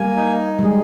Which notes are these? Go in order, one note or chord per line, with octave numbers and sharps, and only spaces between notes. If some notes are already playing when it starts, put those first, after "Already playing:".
Already playing: G3 A#3 G#5
D#4
G3
G#3 G#4